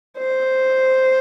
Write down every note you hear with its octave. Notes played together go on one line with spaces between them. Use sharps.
C5